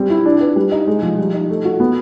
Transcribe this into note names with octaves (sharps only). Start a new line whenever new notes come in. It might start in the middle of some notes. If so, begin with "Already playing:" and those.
Already playing: G3 C4
E4
D4
B4
G3
D#4
G#3
F3
G3
D#4
A3
F#4
B3